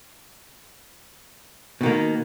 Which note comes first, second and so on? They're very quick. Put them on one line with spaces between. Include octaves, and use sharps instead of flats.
B2 D#3 A#3